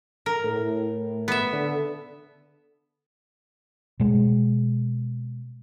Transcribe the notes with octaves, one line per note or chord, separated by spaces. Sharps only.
A#4
A2
B3 E5
D3
B2 G#3